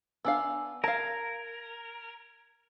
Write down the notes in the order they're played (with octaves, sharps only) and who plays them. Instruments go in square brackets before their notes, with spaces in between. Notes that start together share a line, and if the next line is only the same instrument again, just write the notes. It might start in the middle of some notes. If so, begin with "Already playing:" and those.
[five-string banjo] B3 D4 F5 [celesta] G#5 E6
[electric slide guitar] A#4 [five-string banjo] F5 A5 [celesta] G#6